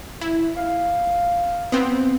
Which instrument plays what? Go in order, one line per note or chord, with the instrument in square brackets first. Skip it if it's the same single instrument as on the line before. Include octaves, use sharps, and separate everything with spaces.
[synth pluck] E4
[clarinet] F5
[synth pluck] B3 C4